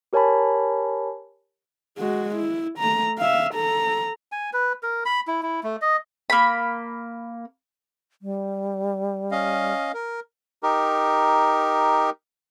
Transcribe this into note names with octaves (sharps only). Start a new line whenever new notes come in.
G4 A#4 C#5 G#5 A5 B5
G#3 F#4
E4
A3 A#5
E5 F5
A4 A#5
G#5
B4
A#4
B5
E4
E4
A3
D#5
A#3 B5
G3
C#4 D#5 F5
A#4
D#4 G4 A#4